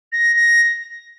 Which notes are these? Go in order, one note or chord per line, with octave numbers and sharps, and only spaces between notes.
A#6
A#6